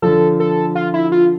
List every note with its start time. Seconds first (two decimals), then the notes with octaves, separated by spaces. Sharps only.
0.02 D3 F3 A4
0.40 A4
0.75 F4
0.94 E4
1.12 F4